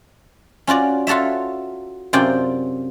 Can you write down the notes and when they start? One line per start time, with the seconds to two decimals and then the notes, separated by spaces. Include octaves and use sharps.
0.67 C#4 F4 F#4 D5
1.07 F4 F#4 A4 C#5 E5
2.13 F#2 C3 F4 D5 G5